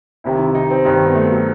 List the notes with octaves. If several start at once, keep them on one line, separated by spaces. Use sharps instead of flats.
C2 C3 D#3 E4
E4
E4
D#4
C4
G2 D#3 D#4
C4
B3
A3
F#3